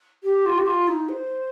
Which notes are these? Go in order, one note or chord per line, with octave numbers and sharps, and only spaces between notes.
G4
F4
G4
F4
D#4
C5